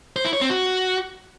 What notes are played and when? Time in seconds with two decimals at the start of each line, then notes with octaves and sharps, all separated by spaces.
0.16 C5
0.25 E4
0.33 C#5
0.41 C4
0.50 F#4